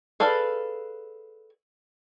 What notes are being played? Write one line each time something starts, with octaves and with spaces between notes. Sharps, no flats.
G#4 A4 B4 D5 F5